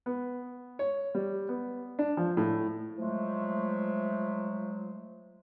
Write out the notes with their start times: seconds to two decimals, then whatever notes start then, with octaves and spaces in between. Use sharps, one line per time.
0.06 B3
0.79 C#5
1.15 G3
1.49 B3
1.99 D4
2.17 F3
2.37 A2
2.99 F3 F#3 G#3 A3